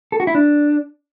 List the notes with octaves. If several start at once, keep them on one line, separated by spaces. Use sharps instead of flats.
A4
F#4
E4
D4